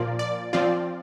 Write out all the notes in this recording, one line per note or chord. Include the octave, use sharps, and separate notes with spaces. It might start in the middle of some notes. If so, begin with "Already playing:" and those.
Already playing: A#2 F3 A#3 F4 D5
D5
F3 C4 F4 D5